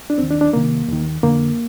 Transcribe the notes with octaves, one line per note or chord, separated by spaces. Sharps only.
D4
D#2 D#3 C4
D4
D4
C2 C3 D#3 A#3
D#2 D#3
F2 D3 A#3